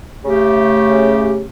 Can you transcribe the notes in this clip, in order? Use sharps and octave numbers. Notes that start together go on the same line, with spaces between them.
C#3 A3 G4